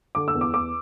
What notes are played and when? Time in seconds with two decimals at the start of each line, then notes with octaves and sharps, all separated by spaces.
0.15 D3 D6
0.28 E6
0.35 E2
0.41 D6
0.53 E2 D6